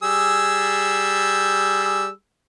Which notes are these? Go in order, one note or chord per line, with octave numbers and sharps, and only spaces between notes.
G3 G#4 E6